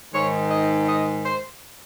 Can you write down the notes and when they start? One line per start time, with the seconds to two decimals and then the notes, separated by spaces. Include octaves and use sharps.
0.13 G#2 D#3 G#3 C#5
0.49 D#5
0.86 D#5
1.23 C5